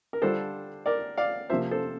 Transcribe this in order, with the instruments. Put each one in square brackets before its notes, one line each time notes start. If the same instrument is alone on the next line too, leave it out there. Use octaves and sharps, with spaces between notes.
[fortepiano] A#4
D3 G3 D4 F4 A4 C5
A#4 D5
D5 F5
C3 F3 A#3 F4 C5 E5
A4 C5